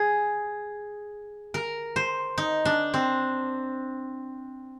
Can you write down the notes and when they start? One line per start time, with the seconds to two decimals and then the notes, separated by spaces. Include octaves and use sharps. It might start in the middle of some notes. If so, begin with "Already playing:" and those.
Already playing: G#4
1.54 A#4
1.96 C5
2.38 D#4
2.65 D4
2.94 C4